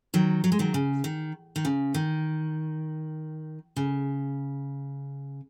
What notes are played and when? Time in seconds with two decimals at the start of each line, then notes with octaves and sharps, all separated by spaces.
0.14 D#3 F#3
0.44 F#3
0.52 G#3
0.59 D#3 F#3
0.74 C#3
1.04 D#3
1.56 D#3
1.65 C#3
1.94 D#3
3.76 C#3